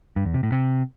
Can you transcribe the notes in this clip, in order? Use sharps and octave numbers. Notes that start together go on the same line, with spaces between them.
G2
E2
C3
A2
C3